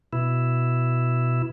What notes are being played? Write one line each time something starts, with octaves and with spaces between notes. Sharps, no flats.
B2 E4